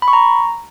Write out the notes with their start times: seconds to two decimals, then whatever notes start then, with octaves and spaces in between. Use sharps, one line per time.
0.02 B5
0.08 C#6
0.13 A#5